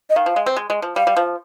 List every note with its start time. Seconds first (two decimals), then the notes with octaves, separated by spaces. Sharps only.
0.10 D#5
0.16 D#3 F5
0.26 F3
0.36 G#3
0.46 C4
0.56 G#3
0.70 G#3
0.82 F3
0.96 G3 F5
1.07 G3
1.17 F3